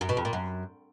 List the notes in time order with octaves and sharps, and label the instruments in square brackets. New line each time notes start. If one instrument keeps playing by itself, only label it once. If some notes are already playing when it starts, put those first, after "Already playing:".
[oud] F#2
B2
F2
A#2
F#2